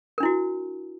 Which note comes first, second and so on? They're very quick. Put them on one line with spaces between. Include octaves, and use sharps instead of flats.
A#4 D4 E4 F#4